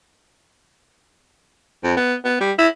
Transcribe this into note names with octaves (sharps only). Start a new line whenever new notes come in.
F2
B3
B3
G3
E4